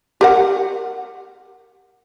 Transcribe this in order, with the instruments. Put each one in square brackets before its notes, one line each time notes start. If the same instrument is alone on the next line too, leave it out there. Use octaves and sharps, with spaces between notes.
[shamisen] G4 A#4 F#5